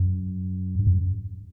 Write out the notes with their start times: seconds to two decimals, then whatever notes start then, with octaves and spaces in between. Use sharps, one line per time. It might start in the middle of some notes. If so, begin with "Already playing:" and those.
Already playing: F#2
0.79 G2
0.87 F#2